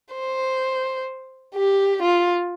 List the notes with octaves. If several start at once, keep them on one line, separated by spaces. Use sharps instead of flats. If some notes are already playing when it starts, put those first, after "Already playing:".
C5
G4
F4